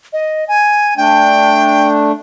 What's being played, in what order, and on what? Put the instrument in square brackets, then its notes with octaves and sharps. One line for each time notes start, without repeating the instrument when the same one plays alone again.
[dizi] D#5
G#5
[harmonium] A3 D4 [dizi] G5